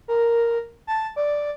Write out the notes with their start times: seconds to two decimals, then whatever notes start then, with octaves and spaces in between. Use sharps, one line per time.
0.08 A#4
0.87 A5
1.16 D5